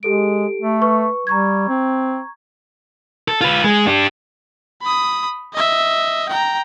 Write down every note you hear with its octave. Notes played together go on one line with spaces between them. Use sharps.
G#3 G4 A4 D7
A3
B4 C#6
G3 A#5 C#6 G#6
C4
A4
F4 B4
G#3
D4 G4
B5 D#6
D#5 E5
G5 A#5